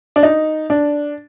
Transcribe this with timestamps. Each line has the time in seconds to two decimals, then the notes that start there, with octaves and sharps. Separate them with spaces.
0.16 D4
0.23 D#4
0.70 D4